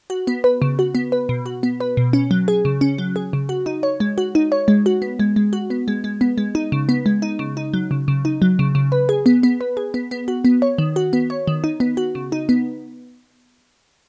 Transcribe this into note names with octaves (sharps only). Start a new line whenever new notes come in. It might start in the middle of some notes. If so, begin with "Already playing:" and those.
F#4
B3
B4
C#3
F#4
B3
B4
B2
F#4
B3
B4
B2
C#4
F#3
G#4
C#3
C#4
F#3
G#4
C#3
F#4
D#4
C#5
G#3
F#4
D#4
C#5
G#3
F#4
B3
G#3
G#3
F#4
B3
G#3
G#3
B3
G#3
D#4
C#3
B3
G#3
D#4
C#3
D#4
F#3
C#3
C#3
D#4
F#3
C#3
C#3
B4
G#4
B3
B3
B4
G#4
B3
B3
F#4
B3
C#5
D#3
F#4
B3
C#5
D#3
D#4
B3
F#4
C#3
D#4
B3